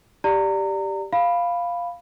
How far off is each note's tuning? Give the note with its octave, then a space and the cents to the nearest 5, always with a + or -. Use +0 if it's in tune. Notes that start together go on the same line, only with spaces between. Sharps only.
G4 +0 D5 +0 A#5 -25
F5 +0 B5 +0